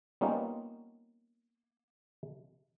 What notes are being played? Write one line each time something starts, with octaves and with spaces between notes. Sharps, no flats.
G3 A#3 B3 C#4 D#4 F4